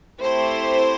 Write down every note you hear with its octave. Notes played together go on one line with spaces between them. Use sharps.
A3 C4 E4 G4 C5